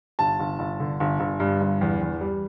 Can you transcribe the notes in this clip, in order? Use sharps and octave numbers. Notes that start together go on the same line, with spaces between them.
G1 A5
G1
G1
D3
G1
G1
G2
G1
E2
E2
G3